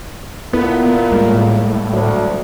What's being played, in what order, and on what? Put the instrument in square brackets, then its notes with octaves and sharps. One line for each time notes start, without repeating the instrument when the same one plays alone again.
[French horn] A#2 [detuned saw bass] B3 [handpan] E4 A4 B4
[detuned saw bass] A2 [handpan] G3 G#3 A#3
[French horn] D2 [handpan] F#3 F#4 D5